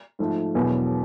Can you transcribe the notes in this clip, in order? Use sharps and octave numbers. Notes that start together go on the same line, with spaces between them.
G#2 F3 A3
E1 E2 B2 F#3 B3